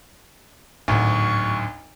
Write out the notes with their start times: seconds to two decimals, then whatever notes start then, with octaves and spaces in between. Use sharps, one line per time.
0.88 G#1 D2 A2 F#3 C#6